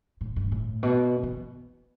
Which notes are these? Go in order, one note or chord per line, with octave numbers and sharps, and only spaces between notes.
A2
G2
A2
B2
E3